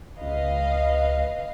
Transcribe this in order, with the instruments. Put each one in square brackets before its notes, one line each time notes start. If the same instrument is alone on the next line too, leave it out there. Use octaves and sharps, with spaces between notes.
[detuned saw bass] C#2 [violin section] B4 D#5 F5